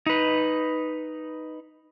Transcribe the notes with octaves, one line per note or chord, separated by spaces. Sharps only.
D#4 B4